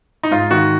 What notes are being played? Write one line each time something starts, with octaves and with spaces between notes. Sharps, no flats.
D#4
G#2 F4
D#3 F#4